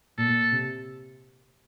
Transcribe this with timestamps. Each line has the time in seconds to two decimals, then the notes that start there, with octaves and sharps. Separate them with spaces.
0.18 A#2 A4
0.52 C3